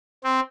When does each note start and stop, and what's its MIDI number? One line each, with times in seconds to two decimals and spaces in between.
0.24 0.40 60